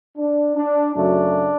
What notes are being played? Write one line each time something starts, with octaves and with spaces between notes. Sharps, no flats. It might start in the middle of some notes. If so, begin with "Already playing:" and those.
D4
D4
F#2 C#3 F#3 A3 D4